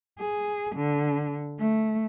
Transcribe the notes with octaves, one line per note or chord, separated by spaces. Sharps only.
G#4
D3
A3